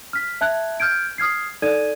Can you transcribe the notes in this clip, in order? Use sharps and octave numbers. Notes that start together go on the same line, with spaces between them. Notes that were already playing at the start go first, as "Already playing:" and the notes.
F6 B6
E5 A5 F#6 G#6
F6 G6 G#6 D7
D#6 F6 G#6 C7
D#4 A4 D5 G#6 D#7